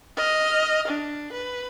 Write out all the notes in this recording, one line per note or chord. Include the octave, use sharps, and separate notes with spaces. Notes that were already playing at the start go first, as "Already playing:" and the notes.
D#5 F6
D4
B4